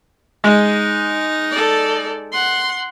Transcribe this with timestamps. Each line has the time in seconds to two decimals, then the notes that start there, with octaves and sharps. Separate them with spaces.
0.44 G#3 D#4
1.51 A4 D5
2.33 F#5 C6